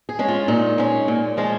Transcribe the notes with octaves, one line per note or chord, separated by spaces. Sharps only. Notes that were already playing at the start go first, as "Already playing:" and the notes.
G#4
G#3 C#4
F4
A#2 D#4
G#3 C#4
A#2
F3 G#3 C#4